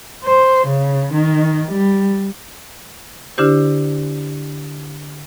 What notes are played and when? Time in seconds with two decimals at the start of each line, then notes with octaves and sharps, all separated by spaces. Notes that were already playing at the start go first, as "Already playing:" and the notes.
0.24 C5
0.67 C#3
1.13 D#3
1.71 G3
3.38 D3 D4 E4 G4 C5